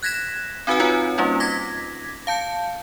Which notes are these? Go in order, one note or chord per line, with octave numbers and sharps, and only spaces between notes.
F#6 G#6 A#6 B6 E7
C4 D#4 F#4 B4 F#5 G#5
C4 D#4 F4 B4 C#5 F#5
G3 A#3 C#4 D#4 F4
D6 G#6 A#6 B6
F5 A5 G6 C#7